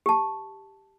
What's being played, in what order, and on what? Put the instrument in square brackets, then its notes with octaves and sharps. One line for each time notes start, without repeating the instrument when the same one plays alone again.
[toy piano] G4 A5